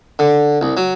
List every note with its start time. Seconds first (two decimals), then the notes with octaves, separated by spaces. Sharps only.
0.19 D3
0.61 C2
0.77 F#3